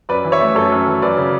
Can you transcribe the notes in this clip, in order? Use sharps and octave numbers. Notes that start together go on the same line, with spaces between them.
F#2 B4 D5
E3
C#5 E5
A3
F#2 A4 C#5
F#2
E3
F#2 B4 D5
C#3